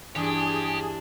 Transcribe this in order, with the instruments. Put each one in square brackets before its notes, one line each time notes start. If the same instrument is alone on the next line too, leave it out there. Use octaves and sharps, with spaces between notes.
[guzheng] G2 E3 [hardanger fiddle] D4 [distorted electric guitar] G4 [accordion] G#4